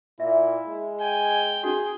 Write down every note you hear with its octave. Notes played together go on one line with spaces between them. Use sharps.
A#2 E4 E5
G#3
G5 G#5
C#4 D#4 F#4 G#4